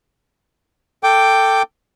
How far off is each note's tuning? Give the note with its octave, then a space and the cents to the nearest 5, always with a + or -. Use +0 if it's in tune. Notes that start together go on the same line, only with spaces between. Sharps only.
A4 +15 G5 +0 D6 +0